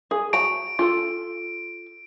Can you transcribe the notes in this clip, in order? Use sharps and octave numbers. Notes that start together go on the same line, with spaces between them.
G#4
F#4 A#5 D7
F4 A4